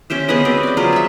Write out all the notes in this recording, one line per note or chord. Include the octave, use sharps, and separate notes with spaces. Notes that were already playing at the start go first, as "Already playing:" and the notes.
C#4 G4 C5 E5
B3 G#4 B4 D#5
C4 F#4 G4
B4 D5
F#3 F4 G#4 C5
C#5 E5